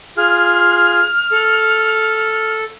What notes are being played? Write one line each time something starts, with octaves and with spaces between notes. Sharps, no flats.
F4 G#4 F6
A4